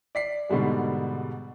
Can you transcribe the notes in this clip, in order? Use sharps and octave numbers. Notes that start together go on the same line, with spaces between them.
D5 B6 C7
G#2 B2 D3 G3 G#3